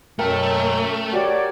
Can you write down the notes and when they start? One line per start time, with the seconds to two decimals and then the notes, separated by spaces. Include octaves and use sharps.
0.19 F#2 B2 F#3 A3 A#4 G5 A5
1.13 F#4 G4 C#5 D5